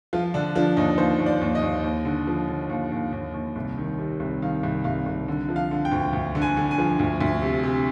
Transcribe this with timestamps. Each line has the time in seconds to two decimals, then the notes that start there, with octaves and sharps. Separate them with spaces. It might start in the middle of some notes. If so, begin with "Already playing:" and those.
0.13 F3 F4
0.34 D3 D4
0.55 F3 D4
0.77 D#2 D#4
0.98 D#2 C5
1.20 D#2
1.26 D5
1.41 D#2
1.55 D#5
1.62 D#2
1.84 D#2
2.05 D3
2.27 F3
2.48 D3
2.69 D#2
2.92 D#2
3.12 D#2
3.34 D#2
3.56 C2
3.78 D#3
3.99 C3
4.20 C2
4.42 D#3 F5
4.63 C2
4.84 C2 F5
5.06 C2
5.28 D3
5.49 F3
5.56 F5
5.71 D3
5.85 G5
5.92 D2
6.13 D2
6.35 D3
6.42 G#5
6.57 D3
6.71 G#5
6.78 F3
6.99 D2
7.21 D2
7.42 C3
7.64 C3